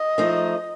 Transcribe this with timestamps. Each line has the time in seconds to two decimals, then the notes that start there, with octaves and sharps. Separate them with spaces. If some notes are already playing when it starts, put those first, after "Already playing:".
Already playing: D#5
0.18 F3 A3 D#4